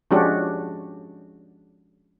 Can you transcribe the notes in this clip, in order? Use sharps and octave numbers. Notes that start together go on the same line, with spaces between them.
F3 G#3 C#4 D4 F#4 G4